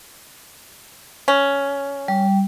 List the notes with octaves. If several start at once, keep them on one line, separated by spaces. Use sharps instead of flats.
C#4
G3